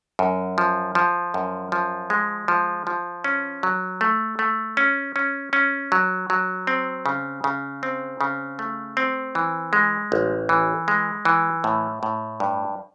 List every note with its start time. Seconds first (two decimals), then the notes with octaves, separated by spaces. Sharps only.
0.19 F#2
0.58 F3
0.95 F3
1.34 F#2
1.72 F3
2.10 G#3
2.48 F3
2.87 F3
3.24 C#4
3.63 F#3
4.01 A3
4.39 A3
4.77 C#4
5.16 C#4
5.53 C#4
5.92 F#3
6.30 F#3
6.67 C4
7.06 C#3
7.44 C#3
7.83 C4
8.21 C#3
8.59 A3
8.97 C4
9.35 E3
9.73 G#3
10.12 A1
10.49 E3
10.88 G#3
11.25 E3
11.64 A2
12.03 A2
12.40 G2